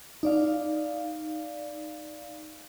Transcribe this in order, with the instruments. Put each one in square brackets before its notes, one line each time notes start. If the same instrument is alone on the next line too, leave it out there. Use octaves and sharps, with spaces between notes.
[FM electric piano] D#4 D5 F5